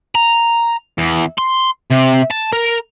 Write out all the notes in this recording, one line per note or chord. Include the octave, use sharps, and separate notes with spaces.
A#5
E2
C6
C3
A5
A#4